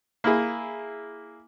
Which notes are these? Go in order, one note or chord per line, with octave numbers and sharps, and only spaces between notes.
A#3 E4 G#4